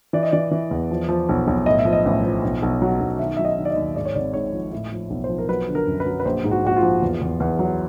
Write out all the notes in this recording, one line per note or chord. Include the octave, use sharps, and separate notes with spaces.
E3 D5
D#5
E3 D5
E3
E2
F3
F3
B1
B1
A2 D#5
E5
F3
D#5
A1
F3
B1
B1
F#3
B1
D#3 E5
F#3 E5
D#5
D#3
D5
D#5
D#2
G#2 D5
C#5
G#1 D5
G#2 C#5
F3
A2
F3
B1
C5
F3
A#4
F#3 B4
D3
A#4
F#2
B4
F#3
B4
A#1 C5
G#2
F#4
A#1 F#4
F4
F3
E2
E2
E2
F#3